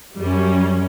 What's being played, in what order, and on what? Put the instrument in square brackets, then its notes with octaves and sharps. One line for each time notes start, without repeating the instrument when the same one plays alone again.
[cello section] F#2 [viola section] G3 C#4